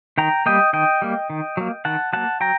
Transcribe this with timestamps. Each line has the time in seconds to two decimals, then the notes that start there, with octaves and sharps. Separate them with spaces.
0.18 D#3 G5 A#5
0.46 G3 A#3 D#5 G5
0.73 D#3 D#5 G5
1.02 G3 A#3
1.30 D#3
1.57 F#3 A#3
1.85 D#3 F#5 A5
2.13 F#3 A#3 F#5 A5
2.40 F#3 G5 A#5